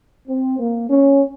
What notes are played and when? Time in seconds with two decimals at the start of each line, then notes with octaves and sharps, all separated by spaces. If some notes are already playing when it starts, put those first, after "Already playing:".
0.28 C4
0.59 A#3
0.89 C#4